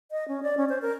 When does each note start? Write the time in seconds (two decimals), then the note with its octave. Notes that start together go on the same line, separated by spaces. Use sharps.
0.11 D#5
0.28 C#4
0.43 D5
0.57 C#4
0.69 C5
0.82 A#4